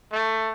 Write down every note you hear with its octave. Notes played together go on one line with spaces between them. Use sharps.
A3